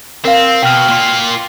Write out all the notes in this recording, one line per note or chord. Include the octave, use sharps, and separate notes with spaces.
C4 A#4 F5
B2 G5 F6
A#3 F4